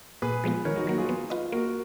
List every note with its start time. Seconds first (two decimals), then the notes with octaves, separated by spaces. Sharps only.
0.22 A#2 G#4 B4
0.44 F3 G#3 B3 F4
0.65 D#3 A#4 C#5
0.76 D#4 F#4
0.87 F#3 A#3 D#4 F#4
0.98 F4 G#4
1.09 B3
1.30 F4 B4 D#5
1.52 A#3 F#4 A#4